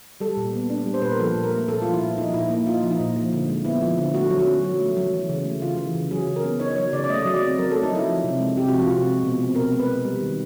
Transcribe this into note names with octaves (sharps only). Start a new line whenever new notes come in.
G3 A4
A#2
B3
D4
G3
C5
A#2 B4
A#4
F3 A4
A#2
A#4
A3
A#2 A4
F3 F4
E4
A#2
F3 D#4
A#2 E4
A#3 E4
D#4 F4
F3
D#4
A#2
F3
D3
G#3
B3 E4
F3
D3
A3 F#4
F#3
F#4
C#4
F#3
A3
F#3
E3
C#3
A3
C#3 F4
E3
C#3
F#3 G#4
C#3
A#4
B3
D#4 C#5
F#3 C#5
C#3 D5
D5
A3 D#5
F#3 D#5
D5
C4
F#3 A#4
A3 A4
D#4
F#3 E4
F3
C3
G#3
C3 G4
F3 F#4
F4
C3 F#4
G#3
B2
C4
B2 A#4
G#3
B4
B2
G3
D#3